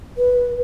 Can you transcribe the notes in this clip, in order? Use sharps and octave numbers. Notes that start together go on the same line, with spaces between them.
B4